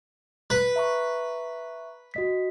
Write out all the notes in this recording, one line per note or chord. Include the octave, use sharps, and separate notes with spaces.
B4
E5 A#5 C#6
F#4 D#5 B6